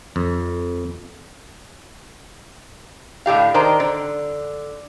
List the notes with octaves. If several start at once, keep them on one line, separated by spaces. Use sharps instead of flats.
F2
A2 D3 G4 F5
D#3 D4 A#4 C5
D3